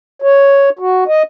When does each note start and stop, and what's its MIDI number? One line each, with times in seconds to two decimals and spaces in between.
0.22 0.70 73
0.79 1.04 66
1.08 1.23 75